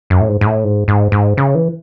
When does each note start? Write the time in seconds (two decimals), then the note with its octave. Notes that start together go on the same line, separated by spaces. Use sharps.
0.10 F#2
0.21 A2
0.28 G#2
0.41 G#2
0.46 A2
0.64 G#2
0.88 G#2
1.12 G#2
1.37 C#3
1.55 E3